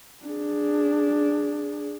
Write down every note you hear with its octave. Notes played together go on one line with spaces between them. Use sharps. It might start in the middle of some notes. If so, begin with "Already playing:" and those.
D4 G#4